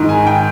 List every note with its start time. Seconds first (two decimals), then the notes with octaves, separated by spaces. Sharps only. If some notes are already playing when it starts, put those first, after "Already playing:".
Already playing: G#2 D#3
0.09 G#5
0.26 G5